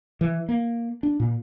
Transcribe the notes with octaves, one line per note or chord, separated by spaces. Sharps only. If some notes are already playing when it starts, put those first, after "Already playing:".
E3
A#3
D4
A#2